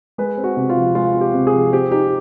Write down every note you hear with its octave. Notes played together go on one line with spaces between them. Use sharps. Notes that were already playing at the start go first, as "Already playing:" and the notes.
G#3 B4
C4
F#4
C3
F4
F3
G#3 F4
C4
G4
C3
G#4
F3
C4 G4
D#4 G4